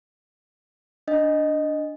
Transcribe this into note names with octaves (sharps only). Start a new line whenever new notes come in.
D4 D#5